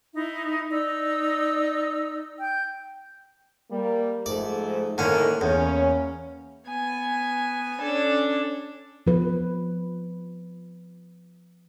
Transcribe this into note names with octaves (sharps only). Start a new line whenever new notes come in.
D#4 E4 E5
D#4 D5 E6
G5 G6
G3 A#3
G#2 F3 A3 D5
A2 D3 D#3 A#3 C#4
E2 A#3 C#4
B3 G#5
C#4 D4 A4
F3 B4